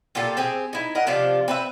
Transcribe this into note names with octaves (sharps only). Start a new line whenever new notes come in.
A#2 F4 G4 A4
C4 G4 G#4
D#4 E4
A#4 D#5 F#5
C3 F3 D4 F4
C4 B4 E5